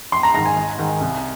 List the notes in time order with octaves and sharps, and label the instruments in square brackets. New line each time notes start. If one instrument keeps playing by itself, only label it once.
[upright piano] A#1 C6
A#5
G#2 D#3 A#5
G#5
G#1
G#2 D#3
C2